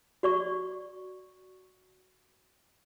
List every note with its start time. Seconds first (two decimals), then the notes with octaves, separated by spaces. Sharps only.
0.23 F#4 D5 C#6